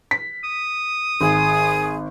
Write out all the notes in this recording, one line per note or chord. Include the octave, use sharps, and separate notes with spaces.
B6
D#6
G#1 G#4